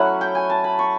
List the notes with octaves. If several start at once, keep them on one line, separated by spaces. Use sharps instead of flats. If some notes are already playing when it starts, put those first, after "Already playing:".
Already playing: F#3 A3 C#4 E4 F#5
G5
G#5
A5
B5
C#6